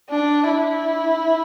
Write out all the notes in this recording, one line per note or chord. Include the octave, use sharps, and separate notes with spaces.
D4
E4